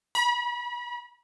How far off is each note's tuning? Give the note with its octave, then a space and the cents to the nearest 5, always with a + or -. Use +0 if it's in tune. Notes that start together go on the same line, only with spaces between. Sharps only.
B5 -35